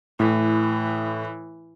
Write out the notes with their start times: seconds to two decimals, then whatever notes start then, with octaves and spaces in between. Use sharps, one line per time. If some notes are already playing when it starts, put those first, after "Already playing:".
0.20 A2 E3